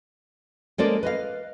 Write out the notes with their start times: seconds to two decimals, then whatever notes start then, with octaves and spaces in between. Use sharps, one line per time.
0.78 G#3 A#3 C#4 A4 C5 D5
1.03 B4 D#5 F5